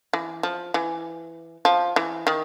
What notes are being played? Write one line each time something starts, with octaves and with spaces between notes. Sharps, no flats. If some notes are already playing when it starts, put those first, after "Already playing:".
E3
F3
E3
F3
E3
D#3